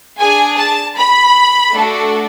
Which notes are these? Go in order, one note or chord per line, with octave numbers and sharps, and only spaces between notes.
D4 G#4 G#5
A5
B5
A3 D4 F#4 A4